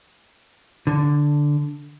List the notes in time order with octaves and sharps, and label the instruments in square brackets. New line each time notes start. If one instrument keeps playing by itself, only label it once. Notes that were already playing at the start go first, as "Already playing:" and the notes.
[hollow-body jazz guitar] D3